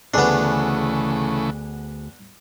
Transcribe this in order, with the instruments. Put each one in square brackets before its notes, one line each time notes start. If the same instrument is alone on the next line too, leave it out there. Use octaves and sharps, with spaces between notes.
[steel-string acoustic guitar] D2 G#4 [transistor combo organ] C#3 E3 A3 [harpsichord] B3 D4